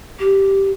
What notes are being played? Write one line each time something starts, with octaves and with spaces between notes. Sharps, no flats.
G4